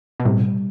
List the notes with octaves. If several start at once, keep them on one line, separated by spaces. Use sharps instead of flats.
B2
A2 C3 G3